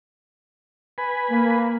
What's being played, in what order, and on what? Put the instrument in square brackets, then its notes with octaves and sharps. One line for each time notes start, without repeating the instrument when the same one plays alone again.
[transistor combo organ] B4 G#5 B5
[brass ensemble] A#3